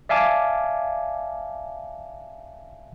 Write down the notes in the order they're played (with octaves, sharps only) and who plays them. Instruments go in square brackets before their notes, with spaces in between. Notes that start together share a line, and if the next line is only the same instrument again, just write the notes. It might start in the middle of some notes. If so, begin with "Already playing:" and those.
[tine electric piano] D5 E5 F5 G#5 A5 D6